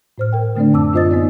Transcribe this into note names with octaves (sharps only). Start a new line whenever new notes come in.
A2 C5 F6
A#4 G5
D3 A3 C4 D4 D5
F#2 A5 D6 E6
C4 F4 C5 D#5 D#6 A6
B3 D#4 D5